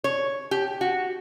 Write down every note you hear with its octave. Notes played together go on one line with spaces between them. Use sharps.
C#5
G4
F#4